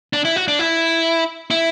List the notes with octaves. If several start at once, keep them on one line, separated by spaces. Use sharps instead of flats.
D4
E4
F#4
D4
E4
E4